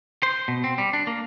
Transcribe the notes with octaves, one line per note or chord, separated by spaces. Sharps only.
C5
B2
C4
G3
D4
A#3